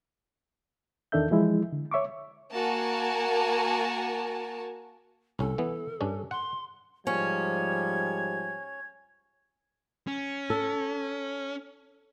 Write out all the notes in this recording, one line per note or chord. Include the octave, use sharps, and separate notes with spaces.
E2 D#3 D4 A4 E5 G6
E3 F3 G#3 E4
D3
C#5 E5 C#6 D6
A#3 F#4 A#4 G#5 A5
C2 C#4 A4
E3 B3
G2 C#4 D4
F#5 C6
G#2 F3 G3 C#4 G#6
C#4
A4